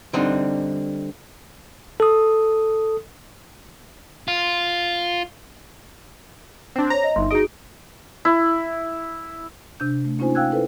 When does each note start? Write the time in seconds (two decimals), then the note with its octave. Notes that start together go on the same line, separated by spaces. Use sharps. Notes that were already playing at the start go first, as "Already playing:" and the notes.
0.13 D3 G3 C4 D4 D#4
2.00 A4 D#6
4.28 F4
6.76 C4 D4
6.90 C5 C#5 A#5
7.04 D#5
7.16 G1 D#4 E5 C6
7.31 D#4 F#4 G#4 D#5 D7
8.25 E4
9.80 C3 D4 G6
10.05 A3
10.19 A#3 C#4 D#4 F4 C5 G#5
10.35 F5 G5 E6 F#6 G#6
10.52 E4 A4 B4 C5